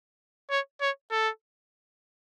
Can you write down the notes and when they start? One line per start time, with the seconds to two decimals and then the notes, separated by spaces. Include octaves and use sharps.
0.50 C#5
0.81 C#5
1.11 A4